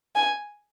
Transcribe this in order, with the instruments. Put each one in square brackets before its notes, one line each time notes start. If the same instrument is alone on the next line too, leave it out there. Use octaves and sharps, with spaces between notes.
[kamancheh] G#5